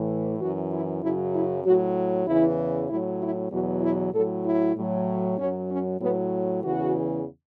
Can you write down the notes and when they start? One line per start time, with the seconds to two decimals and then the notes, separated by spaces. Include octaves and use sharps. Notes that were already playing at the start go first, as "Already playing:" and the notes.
Already playing: A2 E3
0.39 F#2 E3 F#4
0.72 E4
1.02 F#2 C#3 F#3 E4
1.33 E4
1.65 A2 F#3 F#4
2.26 E2 C#3 E3 E4
2.89 A2 F#3 E4
3.20 E4
3.52 E2 B2 F#3 F#4
3.83 E4
4.14 A2 F#3 A4
4.45 E4
4.76 A2 F#3
5.38 F#2 F#3 C#4
5.70 C#4
6.01 A2 F#3 B3
6.63 E2 C#3 E3 F#4